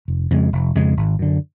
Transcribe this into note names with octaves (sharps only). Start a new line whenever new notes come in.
F1
F2 C#3 G#3
F1
F2 C#3 G#3
G#1
F#2 D3